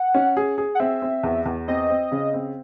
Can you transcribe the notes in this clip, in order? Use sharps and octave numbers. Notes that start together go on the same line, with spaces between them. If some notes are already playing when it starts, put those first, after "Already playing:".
Already playing: F#5
C#4
G#4
G#4
F#5
C4 E5
C4
E2
E2
C4 D#5
C4
C#3
C4